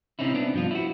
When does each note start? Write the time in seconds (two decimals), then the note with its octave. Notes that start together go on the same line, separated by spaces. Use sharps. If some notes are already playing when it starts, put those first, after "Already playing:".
0.19 C3 C4 C#4 D#4 E4
0.34 B3 D4
0.53 G2 F3 F4
0.71 E4 F#4